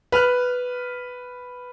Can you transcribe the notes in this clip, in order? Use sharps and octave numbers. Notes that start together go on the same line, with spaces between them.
B4 F6 F#6